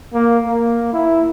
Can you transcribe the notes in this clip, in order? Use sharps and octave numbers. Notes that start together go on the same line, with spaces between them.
A#3
A#3
E4